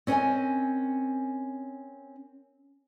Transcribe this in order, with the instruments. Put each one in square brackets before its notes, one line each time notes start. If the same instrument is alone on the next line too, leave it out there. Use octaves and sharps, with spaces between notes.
[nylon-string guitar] C4 C#4 A#4 D5 D#5 G#5